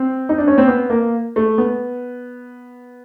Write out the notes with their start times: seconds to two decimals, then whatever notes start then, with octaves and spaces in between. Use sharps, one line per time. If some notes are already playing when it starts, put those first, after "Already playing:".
Already playing: C4
0.29 D#4
0.38 D4
0.48 C#4
0.58 C4
0.68 B3
0.90 A#3
1.36 A3
1.58 B3